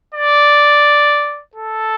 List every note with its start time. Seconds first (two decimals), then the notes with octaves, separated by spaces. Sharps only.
0.15 D5
1.55 A4